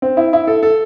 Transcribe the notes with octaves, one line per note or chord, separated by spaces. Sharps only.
C4
E4
E4
A4
A4